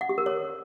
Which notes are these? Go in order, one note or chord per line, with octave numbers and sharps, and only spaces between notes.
F#5
G4
A#4
C#5